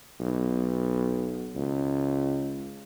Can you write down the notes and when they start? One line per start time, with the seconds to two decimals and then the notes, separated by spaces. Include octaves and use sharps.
0.20 B1
1.56 C#2